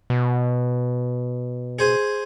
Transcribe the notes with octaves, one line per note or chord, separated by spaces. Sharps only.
B2
G#4 C5 G#5